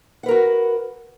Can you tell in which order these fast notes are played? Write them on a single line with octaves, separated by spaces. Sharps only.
F#5 B4 A#4 F#4